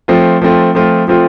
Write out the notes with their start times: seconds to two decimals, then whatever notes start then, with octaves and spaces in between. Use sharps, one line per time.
0.08 F3 A3 C4 F4
0.42 F3 A3 C4 F4
0.75 F3 A3 C4 F4
1.08 F3 A3 C4 F4